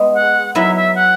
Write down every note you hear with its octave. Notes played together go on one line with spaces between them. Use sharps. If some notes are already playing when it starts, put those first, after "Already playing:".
Already playing: G#3 B3 G#4
F#5
F#3 B3 E4 E5
E5
F#5